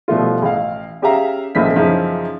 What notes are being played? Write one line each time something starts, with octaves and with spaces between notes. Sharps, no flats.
B2 F3 G3 A3 E4 F4
A1 F5
C#4 G4 G#4 E5 F5 A#5
B1 A#2 C#3 F3 E4 B6
F#2 C#3 E3 F3 D#4 E4